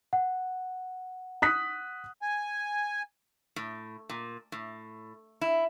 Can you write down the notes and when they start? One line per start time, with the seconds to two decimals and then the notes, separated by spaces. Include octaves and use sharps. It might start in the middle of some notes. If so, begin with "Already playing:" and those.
0.13 F#5
1.42 D#6 F#6 B6
2.22 G#5
3.56 A2
4.09 A#2
4.52 A2
5.41 E4